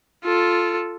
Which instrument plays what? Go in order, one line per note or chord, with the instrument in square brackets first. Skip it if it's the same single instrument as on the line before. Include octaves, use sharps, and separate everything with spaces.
[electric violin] F4 A4